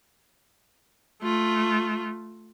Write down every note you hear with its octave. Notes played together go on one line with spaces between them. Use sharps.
A3 F4